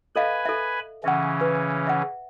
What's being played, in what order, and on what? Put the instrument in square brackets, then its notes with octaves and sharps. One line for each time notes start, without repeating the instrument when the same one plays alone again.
[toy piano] A4 D#5 F5 [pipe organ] B4 G#5 B5
[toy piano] A4 E5
[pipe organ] C#3 E3 C#4 [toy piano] E5 F#5
[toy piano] B4
E5 F#5